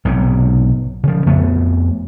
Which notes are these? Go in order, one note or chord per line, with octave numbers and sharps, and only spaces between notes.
B1 G#2 C3
C#3 F3
F2 A3 B3